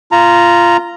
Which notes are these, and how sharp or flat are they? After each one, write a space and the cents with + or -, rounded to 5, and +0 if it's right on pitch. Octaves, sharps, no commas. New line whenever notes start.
F4 -15 A#5 +0